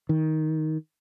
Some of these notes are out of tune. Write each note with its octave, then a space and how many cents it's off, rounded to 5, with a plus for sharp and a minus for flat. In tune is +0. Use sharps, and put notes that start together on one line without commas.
D#3 +10